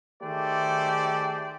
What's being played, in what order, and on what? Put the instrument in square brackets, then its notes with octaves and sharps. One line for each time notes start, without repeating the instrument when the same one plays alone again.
[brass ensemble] D#3 A3 G4 G#4 C5 D5